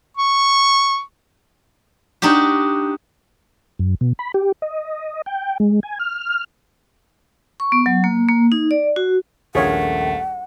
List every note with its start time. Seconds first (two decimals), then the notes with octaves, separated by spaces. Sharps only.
0.17 C#6
2.22 D4 D#4 F#4 G4
3.79 F#2
4.01 B2
4.19 B5
4.34 G4
4.62 D#5
5.26 G5
5.60 G#3
5.83 G#5
5.99 F6
7.60 C#6
7.72 B3
7.86 F#3
8.04 A#3
8.29 A#3
8.52 D#4
8.71 D5
8.96 F#4
9.55 D#1 A#1 A3 G#4 A#4 C#5 F5 F#5